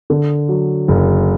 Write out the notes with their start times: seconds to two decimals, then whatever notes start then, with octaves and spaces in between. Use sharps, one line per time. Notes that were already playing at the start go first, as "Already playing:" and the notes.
0.10 D3
0.49 F#3
0.88 F#1